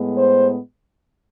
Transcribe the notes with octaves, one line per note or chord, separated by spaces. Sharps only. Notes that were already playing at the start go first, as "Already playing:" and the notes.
Already playing: A2 G#3 B3
C5